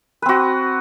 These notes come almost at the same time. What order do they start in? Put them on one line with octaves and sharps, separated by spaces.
B4 C4 F#4